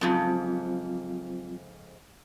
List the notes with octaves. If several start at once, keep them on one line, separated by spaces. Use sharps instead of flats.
F2 G#2 C#3 F#3 C4 F4